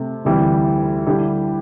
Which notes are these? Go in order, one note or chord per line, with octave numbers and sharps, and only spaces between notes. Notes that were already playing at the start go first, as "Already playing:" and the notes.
Already playing: C3 A3 C4
D2 C3 E3 G3 E4
D3 G3 E4 G4